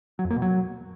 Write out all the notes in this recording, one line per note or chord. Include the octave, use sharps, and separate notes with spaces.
F#3
F2
A#3
B2
F#3